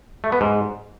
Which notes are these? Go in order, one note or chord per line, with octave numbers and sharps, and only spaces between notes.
A3
B3
G#2